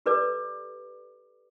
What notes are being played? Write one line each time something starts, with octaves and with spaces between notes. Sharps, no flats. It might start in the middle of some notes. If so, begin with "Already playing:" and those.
G4 A4 B4 D5 D6 D#6